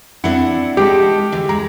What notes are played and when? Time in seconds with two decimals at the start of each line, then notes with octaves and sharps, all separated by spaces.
0.24 C4 D4 E4 F#5
0.77 G#3 G4 A4
1.32 D2 E3
1.49 G#3 A#5